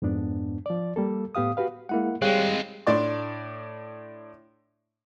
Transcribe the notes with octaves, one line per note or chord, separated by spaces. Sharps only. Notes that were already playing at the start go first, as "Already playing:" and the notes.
F2 G#2 B3 D4
F3 D5
G3 A#3 A4
A2 B3 G4 F5 D#6
F#4 G4 B4 F5
G#3 A#3 E4 F#5
G3 G#3 C4 G#4 C#5 F5 G5 F#6
A2 D4 D5 C6 D6